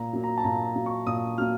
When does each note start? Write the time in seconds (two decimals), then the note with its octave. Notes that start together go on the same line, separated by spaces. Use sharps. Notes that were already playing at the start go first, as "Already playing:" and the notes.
Already playing: A#2 A#5
0.13 F#3 A#3
0.24 A#5
0.38 A5
0.44 A#2 A#5
0.65 A#5
0.76 F#3 A#3
0.86 C#6
1.06 A#2 D#6
1.38 F#3 A#3 F6